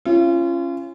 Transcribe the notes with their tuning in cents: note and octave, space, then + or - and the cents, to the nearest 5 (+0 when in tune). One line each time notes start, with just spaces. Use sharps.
C#4 -15 F4 -35